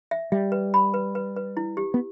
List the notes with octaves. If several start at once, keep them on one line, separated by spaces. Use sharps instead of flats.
E5
G3 E5
B4
B5
B4
B4
B4
E4
G4
B3